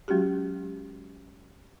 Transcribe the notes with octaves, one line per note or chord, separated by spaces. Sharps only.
F#3 G#3 C#4 F#4 G4